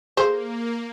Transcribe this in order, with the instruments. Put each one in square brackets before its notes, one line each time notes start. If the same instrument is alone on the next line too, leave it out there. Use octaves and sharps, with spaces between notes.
[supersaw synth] A#3 [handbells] G#4 A4 F5 [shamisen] C5